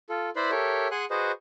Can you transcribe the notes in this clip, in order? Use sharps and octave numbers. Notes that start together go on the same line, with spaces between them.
F4 A4
E4 B4 C5 D5 B5 C6
G4 A4 A#4 C#5 E5
G#4 F#5 G#5 C6 F#6
F#4 G#4 B4 C5 D#5